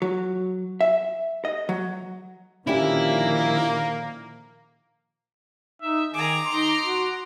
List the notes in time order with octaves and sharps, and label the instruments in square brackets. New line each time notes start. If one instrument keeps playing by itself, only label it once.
[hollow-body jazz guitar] F#3
E5
D#5
F#3
[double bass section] A#2 D#3 F3 [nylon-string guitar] D3 C#4 G4 [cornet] A#3 [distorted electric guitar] E4
[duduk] D#4 [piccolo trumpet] E5
[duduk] D#3 [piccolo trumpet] G#4 [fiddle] A#5 D6
[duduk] D#4 [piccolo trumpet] C6
[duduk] F#4